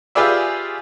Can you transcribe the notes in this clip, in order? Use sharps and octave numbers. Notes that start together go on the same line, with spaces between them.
F4 G4 G#4 B4 D5 E5